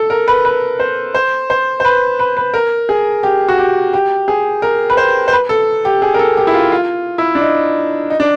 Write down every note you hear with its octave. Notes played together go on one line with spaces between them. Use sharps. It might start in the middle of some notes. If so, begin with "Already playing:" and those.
Already playing: A4
A#4
B4
B4
C5
C5
C5
C5
B4
B4
B4
A#4
G#4
G4
F#4
G4
G4
G#4
A#4
B4
C5
C5
B4
A4
G4
G#4
A#4
A4
G4
E4
F4
F4
E4
D4
D#4
D#4
D4